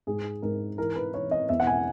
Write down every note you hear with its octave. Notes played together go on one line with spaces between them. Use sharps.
G#2 G#4
G#2 A#4
E3 A#4
B4
E3 C#5
D#5
E2 E5
F#5
G#5